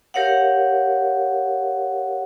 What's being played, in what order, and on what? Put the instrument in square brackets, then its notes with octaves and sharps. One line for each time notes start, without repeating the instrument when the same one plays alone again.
[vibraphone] G4 A#4 C#5 F5 F#5